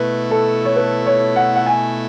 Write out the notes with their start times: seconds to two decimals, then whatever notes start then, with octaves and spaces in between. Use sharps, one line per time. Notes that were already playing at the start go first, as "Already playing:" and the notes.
Already playing: B2 A3 E4 B4
0.31 A4
0.65 C#5
0.76 B4
1.06 C#5
1.36 F#5
1.56 F#5
1.66 G#5